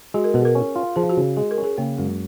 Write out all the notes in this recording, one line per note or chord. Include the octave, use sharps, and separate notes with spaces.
G#3 F#4
A#4
B2 G#4
A#4
C#4
F4
F3 G#4
F#4
C#3
G#3 G#4
A#4
C#4
G#4
C#3 A#3
F#2 G#3